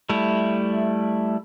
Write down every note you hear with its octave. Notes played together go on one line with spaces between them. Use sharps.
G3 A3 E4